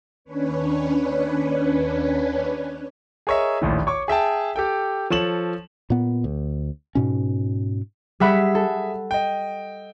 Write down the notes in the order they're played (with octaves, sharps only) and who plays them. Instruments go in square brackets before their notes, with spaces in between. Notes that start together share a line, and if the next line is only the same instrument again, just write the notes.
[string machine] D#2 C#4 D4 B4 C#5
[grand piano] G#4 A#4 C#5 D#5 E5
A#1 D#2 A2
C#5 C#6 D6
G#4 E5 G5 A5
G4 A4 G5
F3 A4 C#5 E7 F#7
[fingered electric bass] A#2 B3
D2
G#2 B2 C#4
[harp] G3 F#5 B5 [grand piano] G#4 E5
[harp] A4
[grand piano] D#5 G5